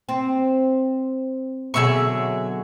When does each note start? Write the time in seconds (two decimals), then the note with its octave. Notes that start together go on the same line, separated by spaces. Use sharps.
0.09 C4
1.74 B2 D3 F#3 G#4 E5 C#6